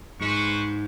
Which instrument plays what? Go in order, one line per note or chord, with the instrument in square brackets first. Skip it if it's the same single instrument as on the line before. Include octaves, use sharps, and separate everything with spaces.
[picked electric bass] G#2 [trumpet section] B4 C5 C#6